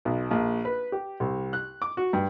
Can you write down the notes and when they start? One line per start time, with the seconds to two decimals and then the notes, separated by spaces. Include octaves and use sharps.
0.05 B1
0.31 A#1
0.65 B4
0.92 G4
1.20 C2
1.53 F#6
1.82 D6
1.97 F#4
2.13 G2